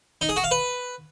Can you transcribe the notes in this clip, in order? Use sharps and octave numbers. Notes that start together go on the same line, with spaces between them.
D#4
G#4
F#4
F5
B4